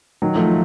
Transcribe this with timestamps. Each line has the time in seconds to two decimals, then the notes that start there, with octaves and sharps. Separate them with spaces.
0.22 D#3 F#3
0.36 F3 A3